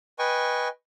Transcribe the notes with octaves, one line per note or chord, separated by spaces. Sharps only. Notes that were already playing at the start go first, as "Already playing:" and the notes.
B4 D#5 G5 G#5 C#6